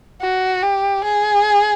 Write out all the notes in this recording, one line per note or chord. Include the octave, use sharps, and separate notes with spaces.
F#4
G4
G#4